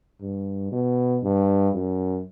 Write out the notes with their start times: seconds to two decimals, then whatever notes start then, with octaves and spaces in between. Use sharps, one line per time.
0.21 G2
0.72 B2
1.23 G2
1.74 F#2